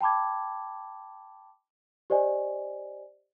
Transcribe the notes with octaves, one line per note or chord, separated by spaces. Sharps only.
G5 A5 B5 D6 G#6
G4 C5 D5 D#5 G#5